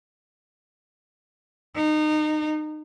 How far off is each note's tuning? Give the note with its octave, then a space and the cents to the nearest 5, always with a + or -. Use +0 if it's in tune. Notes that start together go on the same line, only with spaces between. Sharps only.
D#4 -25